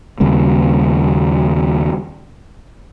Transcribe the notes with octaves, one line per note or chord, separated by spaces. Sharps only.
D#2 C#3 G3 A#3